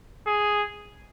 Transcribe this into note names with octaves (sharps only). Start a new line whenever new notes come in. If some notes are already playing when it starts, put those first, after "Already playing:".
G#4